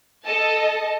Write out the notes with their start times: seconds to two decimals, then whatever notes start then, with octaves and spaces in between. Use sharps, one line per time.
0.24 A4 D#5 A5